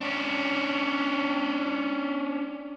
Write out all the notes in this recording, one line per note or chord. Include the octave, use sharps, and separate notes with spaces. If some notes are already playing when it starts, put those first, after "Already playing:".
C#4 D4